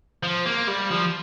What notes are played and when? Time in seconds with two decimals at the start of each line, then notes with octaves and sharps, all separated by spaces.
0.23 F3
0.46 A#3
0.68 G3
0.91 F3